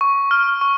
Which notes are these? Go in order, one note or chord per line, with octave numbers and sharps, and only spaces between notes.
C#6
F6
C#6